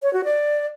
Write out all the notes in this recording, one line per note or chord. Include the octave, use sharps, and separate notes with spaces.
C#5
F#4
D5